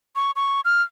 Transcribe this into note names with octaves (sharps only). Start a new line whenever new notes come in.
C#6
C#6
F6